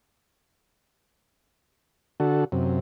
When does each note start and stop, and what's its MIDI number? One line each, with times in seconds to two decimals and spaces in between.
2.20 2.44 50
2.20 2.44 66
2.20 2.44 69
2.52 2.79 42
2.52 2.79 48